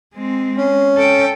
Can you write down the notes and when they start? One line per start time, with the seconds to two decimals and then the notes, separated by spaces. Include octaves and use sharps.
0.14 G#3 C4
0.57 C#4
0.96 A4 G5